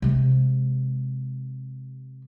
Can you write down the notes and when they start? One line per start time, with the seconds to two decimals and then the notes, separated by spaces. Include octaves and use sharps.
0.02 C3 G#3